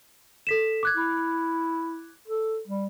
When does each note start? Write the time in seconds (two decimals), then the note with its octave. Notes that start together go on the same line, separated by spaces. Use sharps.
0.47 A4 B6 E7
0.83 D6 F#6 G#6
0.97 E4
2.28 A4
2.67 G3